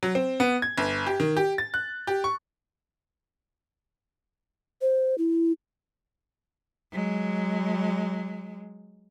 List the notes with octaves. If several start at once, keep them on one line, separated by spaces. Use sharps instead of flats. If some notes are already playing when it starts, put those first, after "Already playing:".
F#3
C4
B3
G#6
G1
G4
D#3
G4
A6
F#6
G4
C#6
C5
E4
F#3 G#3